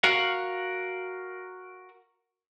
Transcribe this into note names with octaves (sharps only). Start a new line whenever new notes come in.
F#4 A#4 F5 F#5